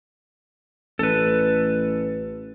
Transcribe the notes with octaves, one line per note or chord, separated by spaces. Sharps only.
A1 A4 B4